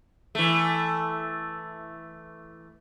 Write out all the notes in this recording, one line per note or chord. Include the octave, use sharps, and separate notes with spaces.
E3 A3